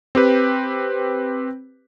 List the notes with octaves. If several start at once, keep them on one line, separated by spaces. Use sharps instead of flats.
C4 G4 B4